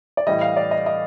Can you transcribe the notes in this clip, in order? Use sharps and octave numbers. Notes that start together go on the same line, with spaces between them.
D5
A2 E3 G3 D#5
F5
D5
D#5
D#5